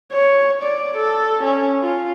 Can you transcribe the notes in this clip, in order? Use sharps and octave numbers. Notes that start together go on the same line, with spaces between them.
C#5
D5
A4
C#4
F4